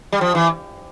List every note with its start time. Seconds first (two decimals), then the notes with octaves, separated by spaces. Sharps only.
0.12 G3
0.21 F3
0.35 E3